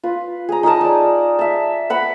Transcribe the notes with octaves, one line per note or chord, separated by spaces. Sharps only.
F4 B4
G#4 A#5
D#4 G#4 A#4 A5
D#4 D5
E5 A5
B4 F#5 B5